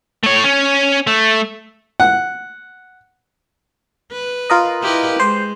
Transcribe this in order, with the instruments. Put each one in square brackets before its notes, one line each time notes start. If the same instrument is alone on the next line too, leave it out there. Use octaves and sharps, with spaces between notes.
[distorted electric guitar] A3 C#5
C#4
A3
[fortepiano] F#5
[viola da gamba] B4
[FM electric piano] F4 A#4 D#5
[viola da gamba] E4 G4 B4
[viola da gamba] G#3 [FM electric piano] C5